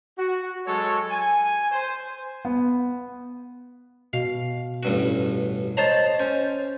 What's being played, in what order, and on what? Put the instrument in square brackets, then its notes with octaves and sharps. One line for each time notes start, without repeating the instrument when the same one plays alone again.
[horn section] F#4
F#3 G#3 A4 C#5
G#5
C5
[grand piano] B3
[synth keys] B2 [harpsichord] F5
[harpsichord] A1 G2 F#4
[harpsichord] C5 A5 A#5 [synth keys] C#5 D#5 A6
[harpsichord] C#4 [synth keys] C5